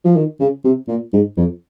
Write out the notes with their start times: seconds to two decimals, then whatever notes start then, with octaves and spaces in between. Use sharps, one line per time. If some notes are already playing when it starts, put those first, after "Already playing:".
0.05 F3
0.16 D#3
0.40 C#3
0.64 C3
0.88 A#2
1.13 G#2
1.37 F2